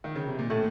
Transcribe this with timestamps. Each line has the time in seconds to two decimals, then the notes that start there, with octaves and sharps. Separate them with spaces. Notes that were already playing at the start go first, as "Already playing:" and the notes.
0.04 D#3
0.15 C#3
0.27 C3
0.39 A#2
0.50 A2 A3